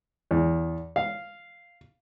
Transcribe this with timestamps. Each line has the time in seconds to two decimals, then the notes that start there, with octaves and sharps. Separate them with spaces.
0.31 E2
0.96 F5